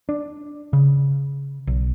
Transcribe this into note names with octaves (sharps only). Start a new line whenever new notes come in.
D4
C#3
B1